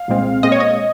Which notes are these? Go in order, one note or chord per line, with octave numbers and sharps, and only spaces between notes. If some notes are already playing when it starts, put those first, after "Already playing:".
Already playing: F5
C2 A#2 G#3 C4
A#2 G#3 C4 D#5
C#5
D#5